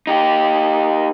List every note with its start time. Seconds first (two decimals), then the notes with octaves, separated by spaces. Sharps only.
0.07 D#4 G4